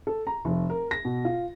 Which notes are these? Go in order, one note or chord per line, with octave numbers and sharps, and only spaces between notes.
A4
A#5
F1
A#4
A#6
B2
F4